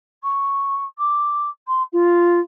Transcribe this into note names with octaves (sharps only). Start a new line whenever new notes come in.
C#6
D6
C6
F4